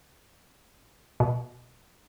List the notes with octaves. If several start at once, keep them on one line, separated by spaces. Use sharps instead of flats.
B2